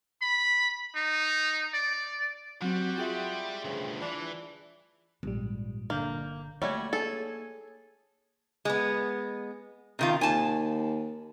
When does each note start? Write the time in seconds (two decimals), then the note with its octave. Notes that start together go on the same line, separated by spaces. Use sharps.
0.22 B5
0.95 D#4
1.74 D5
2.62 F#3 G3 C4 F#4
2.98 F4 G#4 E5 G5 C6
3.64 D2 G2 C#3
4.02 E3 D4
5.23 A#1 G#2 G3
5.90 G1 D3 A#3 G6
6.62 G3 A3 A#3 F#4 C#5 G#6
6.93 G#4 A4
8.65 G#3 B3
9.99 C3 D#3 F4
10.21 D#2 G#5 A5